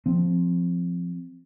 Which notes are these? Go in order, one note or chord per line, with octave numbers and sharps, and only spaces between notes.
F3 C4